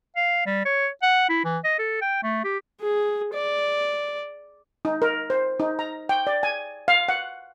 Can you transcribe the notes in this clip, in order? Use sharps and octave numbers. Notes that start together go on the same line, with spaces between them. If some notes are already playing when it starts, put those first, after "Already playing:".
F5
G3
C#5
F#5
E4
E3
D#5
A4
G5
A3
G4
G#4
D5
D#4
A#4
C5
D#4
A#5
G5
D5
G#5
F5
F#5